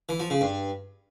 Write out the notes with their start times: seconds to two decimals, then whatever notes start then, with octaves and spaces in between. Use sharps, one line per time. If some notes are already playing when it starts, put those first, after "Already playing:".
0.09 E3
0.20 F3
0.30 C#3
0.41 G2